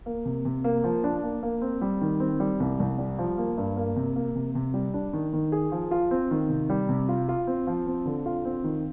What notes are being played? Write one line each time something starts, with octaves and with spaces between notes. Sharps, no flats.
A#3
C3
C3
A#3
F3
D4
A#3
A#3
C4
G3
D#3
C4
G3
C2
C2
G3
F3
A#3
G2
A#3
C3
A#3
C3
C3
G3
D4
D#3
D#3
G#4
F3
F4
C4
D#3
C3
G3
C3
F4
F4
C4
F3
C4
D3
F4
C4
D#3